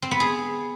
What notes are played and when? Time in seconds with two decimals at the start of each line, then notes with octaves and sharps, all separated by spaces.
0.02 C4
0.11 B3
0.20 G#4